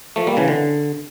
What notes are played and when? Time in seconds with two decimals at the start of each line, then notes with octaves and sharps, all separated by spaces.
0.16 F3 A3
0.27 G3 A#3
0.37 C#3 E3
0.48 D3